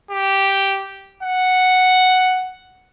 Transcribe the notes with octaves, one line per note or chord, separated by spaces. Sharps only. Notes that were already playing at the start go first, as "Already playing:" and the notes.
G4
F#5